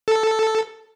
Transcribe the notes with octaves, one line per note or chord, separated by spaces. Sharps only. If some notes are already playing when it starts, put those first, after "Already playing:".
A4